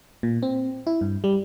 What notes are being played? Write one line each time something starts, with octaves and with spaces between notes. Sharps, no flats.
A#2
C4
E4
G2
G3